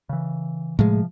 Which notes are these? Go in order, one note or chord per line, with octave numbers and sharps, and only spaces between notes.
C#3 E3
A2 C3 F3 G#3